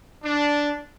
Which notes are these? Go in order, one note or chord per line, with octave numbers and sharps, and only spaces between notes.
D4